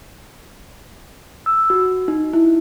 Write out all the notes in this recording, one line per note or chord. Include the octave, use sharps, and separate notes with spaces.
E6
F#4
D#4
E4